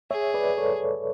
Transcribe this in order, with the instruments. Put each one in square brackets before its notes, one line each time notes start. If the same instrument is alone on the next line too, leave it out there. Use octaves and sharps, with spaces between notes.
[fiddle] G#4 [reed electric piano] C#5 E5
[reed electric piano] B4 D5
A4 C#5